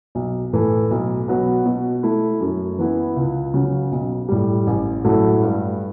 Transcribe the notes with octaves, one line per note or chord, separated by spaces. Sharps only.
B1
A2 E3 A3
B1
B2 F#3 B3
B2
A3 E4
F#2
E3 B3 E4
C#2
C#3 F#3
B1
A2 G3
A1
A2 F#3 A3 E4
G2